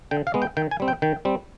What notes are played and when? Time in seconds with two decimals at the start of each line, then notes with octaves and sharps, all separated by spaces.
0.11 D3 G5
0.27 F5
0.34 G#3 B3
0.42 G5
0.57 D#3 G5
0.71 G#5
0.80 G3 C4
0.88 G5
1.02 D#3 G5
1.25 G3 C4